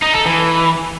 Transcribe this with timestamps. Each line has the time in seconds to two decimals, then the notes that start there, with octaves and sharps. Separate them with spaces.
0.02 D#4
0.14 A4
0.26 E3